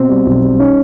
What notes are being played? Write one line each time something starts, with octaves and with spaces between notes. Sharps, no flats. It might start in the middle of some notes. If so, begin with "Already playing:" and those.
Already playing: B2 C4
G3
B1
G3
C#4 D#4